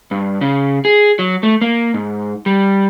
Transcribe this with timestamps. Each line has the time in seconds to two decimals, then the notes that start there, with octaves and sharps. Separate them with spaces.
0.11 G2
0.41 C#3
0.85 G#4
1.19 F#3
1.43 A3
1.61 A#3
1.94 G#2
2.46 G3